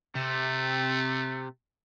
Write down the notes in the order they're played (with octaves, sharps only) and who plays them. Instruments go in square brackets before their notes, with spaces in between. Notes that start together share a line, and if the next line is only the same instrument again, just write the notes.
[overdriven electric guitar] C3 [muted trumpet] A3